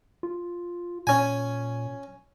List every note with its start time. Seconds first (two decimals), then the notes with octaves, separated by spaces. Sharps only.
0.23 F4
1.07 A#2 C#4 G#5